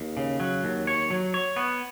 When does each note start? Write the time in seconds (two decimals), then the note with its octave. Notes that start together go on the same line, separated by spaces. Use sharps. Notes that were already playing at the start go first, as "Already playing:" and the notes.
Already playing: D#2
0.17 C#3
0.40 F#3
0.64 D#2
0.87 C#5
1.10 F#3
1.34 C#5
1.56 B3